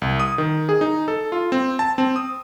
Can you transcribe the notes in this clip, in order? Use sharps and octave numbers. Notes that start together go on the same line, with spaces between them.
C2
D#6
D#3
G#4
D#4
A4
F4
C4
A5
C4
D#6